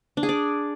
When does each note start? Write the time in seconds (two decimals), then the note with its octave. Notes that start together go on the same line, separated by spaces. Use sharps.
0.17 D4
0.23 G#4
0.29 D5